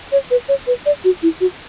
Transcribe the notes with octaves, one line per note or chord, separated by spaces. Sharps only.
C#5
B4
C#5
B4
D5
F#4
E4
F#4